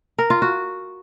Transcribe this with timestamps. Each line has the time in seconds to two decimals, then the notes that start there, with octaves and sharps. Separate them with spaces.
0.19 A#4
0.30 F4
0.42 F#4